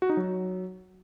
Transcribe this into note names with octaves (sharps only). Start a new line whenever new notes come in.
F#4
D#4
F#3